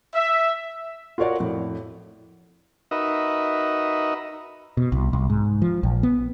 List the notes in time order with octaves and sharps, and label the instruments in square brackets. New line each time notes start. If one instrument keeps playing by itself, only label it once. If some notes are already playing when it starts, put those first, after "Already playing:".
[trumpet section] E5
[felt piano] F4 F#4 A#4 C#5 D5 F#5
F2 A2
[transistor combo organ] D#4 F#4 A#4 B4 D#5 E5
[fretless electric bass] B2
C2
C2
G#2
F3
A#1
B3